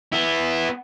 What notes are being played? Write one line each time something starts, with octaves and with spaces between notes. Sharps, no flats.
B3 E4